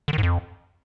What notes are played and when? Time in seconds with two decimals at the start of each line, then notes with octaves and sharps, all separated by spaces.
0.08 D3
0.13 D#3
0.18 G#2
0.23 F2